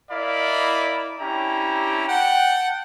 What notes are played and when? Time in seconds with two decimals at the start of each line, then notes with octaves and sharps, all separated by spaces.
0.11 E4 A#4 D5 D#5 F5 B5
1.19 C#4 D4 E4 G4 G5 A#5
2.08 F#5 G5 A5